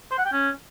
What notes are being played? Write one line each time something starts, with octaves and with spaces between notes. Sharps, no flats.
C5
F#5
G5
C#4